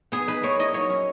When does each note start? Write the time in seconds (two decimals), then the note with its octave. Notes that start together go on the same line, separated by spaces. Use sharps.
0.12 B3 G#4
0.27 D#4 B4
0.43 A#3 C#5
0.59 E4 D#5
0.74 F#3 C#5
0.90 C#4